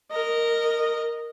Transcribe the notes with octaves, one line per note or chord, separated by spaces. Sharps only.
A#4 D#5